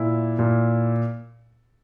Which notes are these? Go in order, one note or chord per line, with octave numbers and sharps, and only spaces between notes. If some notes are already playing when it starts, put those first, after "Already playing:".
Already playing: A#2 E4
A#2